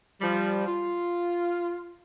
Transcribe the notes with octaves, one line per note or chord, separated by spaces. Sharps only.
F3 G3
F4